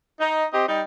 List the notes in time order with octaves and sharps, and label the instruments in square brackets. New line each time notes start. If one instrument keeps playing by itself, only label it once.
[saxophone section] D#4
C4 G4 D#5
G3 D#4